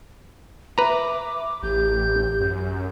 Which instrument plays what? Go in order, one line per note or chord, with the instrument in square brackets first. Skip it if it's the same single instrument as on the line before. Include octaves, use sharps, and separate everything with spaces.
[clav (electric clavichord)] B4 A#5 [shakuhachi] E5 [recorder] D6
[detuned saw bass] A1 [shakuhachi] G4 [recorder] G6
[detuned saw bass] F#2